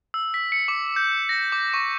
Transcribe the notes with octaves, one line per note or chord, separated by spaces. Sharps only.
E6
B6
C#7
D6
G6
A#6
D6
C#6